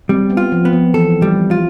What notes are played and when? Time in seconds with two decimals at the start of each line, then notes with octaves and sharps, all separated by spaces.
0.09 G3 C4
0.30 B3
0.37 F4
0.52 F3
0.65 B3
0.73 F3
0.94 E3 A4
1.22 G3
1.51 F4